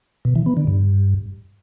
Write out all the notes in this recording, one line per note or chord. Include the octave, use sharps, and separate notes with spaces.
B2
E3
B3
D3
G2